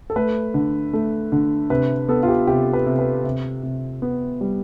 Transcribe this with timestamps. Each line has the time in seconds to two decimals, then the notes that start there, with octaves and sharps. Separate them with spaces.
0.10 A4
0.16 A3 B4
0.54 D3
0.93 A3
1.32 D3
1.70 C3 B4
2.09 B3 A4
2.23 F4
2.28 G4
2.47 C3 G4
2.73 B4
2.86 C3
2.99 B4
3.24 C3
3.63 C3
4.02 B3
4.41 G3